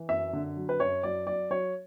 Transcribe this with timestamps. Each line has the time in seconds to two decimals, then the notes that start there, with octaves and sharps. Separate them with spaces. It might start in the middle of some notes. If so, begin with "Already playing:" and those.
Already playing: E3
0.09 F#2 E5
0.33 D3
0.57 F#3
0.69 B4
0.80 F#2 C#5
1.03 F#3 D5
1.27 F#3 D5
1.50 F#3 C#5